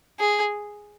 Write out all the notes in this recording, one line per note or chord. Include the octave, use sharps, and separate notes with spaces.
G#4